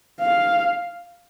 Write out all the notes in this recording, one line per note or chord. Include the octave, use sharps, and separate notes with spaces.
F5